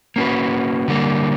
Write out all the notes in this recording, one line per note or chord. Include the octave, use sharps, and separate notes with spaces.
A#3 C#4 F#4 B4
D3 G3 A#3